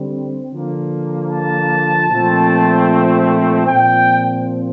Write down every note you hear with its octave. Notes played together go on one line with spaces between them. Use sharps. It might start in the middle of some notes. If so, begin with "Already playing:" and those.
Already playing: D3 G3 C4
D3 F3 A#3
A5
A#2 F3 A3 C4
A#2 F3 C4 G5